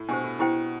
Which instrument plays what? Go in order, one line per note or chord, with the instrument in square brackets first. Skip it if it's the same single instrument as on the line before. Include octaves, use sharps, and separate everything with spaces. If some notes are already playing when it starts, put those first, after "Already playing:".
Already playing: [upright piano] A2
[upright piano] B2 [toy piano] D4 G4 C5
[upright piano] A2
[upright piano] B2 [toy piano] E4 G4 C5 G5